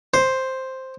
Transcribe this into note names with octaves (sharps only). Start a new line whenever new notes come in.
C5